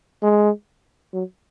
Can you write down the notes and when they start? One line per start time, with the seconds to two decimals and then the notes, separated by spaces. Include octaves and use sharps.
0.23 G#3
1.14 F#3